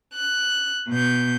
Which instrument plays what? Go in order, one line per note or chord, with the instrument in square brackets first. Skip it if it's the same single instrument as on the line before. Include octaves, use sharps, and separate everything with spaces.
[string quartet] F#6
B2 G6